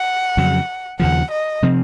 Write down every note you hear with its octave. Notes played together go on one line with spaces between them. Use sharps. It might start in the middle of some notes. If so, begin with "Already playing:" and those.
Already playing: F#5
F2 C#3 F#3
D#2 C#3 F3 F#5
D#5
C3 F3 C4